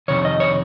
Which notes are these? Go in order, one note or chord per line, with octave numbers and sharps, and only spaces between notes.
F2 C3 D#3 C#5
D#5
C#5